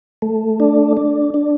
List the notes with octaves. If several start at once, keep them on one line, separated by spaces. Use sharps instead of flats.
A3
D4
D4
D4